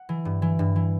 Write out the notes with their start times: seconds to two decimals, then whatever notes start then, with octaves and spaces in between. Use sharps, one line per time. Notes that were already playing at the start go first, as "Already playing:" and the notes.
Already playing: F#5
0.09 E3
0.25 G2
0.42 E3
0.59 G2
0.76 E3